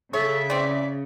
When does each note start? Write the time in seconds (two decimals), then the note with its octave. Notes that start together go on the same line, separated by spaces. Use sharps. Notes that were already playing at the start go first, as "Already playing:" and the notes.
0.13 C#3 A4 C#5 E5
0.50 E3 C4 D5